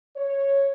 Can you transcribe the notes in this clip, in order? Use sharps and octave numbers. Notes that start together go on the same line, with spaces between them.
C#5